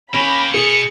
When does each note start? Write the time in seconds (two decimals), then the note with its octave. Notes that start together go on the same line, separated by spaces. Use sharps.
0.14 A#3 C#4 G4 B5
0.54 B2 B3 G#4 C#7